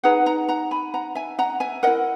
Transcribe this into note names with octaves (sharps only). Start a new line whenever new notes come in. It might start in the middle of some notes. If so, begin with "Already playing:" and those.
D#4 G#4 B4 F#5 A#5
F#5 A#5
F#5 A#5
G#5 B5
F#5 A#5
E5 G#5
F#5 A#5
E5 G#5
E4 A#4 D#5 F#5